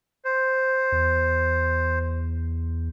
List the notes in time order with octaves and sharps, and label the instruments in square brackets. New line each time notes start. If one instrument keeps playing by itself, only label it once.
[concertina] C5
[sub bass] E2